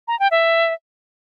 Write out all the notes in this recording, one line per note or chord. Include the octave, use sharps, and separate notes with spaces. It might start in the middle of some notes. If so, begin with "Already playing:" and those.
A#5
G5
E5